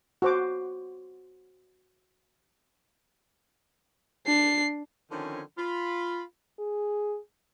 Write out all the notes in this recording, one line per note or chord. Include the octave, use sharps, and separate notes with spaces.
F#4 C5 D6
D4 C7
D3 D#3 F3 C4 C#4
F4 B5
G#4